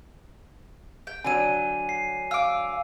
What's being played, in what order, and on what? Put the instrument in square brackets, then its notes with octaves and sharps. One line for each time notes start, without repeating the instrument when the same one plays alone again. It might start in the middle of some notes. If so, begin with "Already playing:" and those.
[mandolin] G5
[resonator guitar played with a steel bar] D3 F#3 [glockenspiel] G#5 D#7
[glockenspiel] C7
[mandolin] F5 D6 [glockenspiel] E6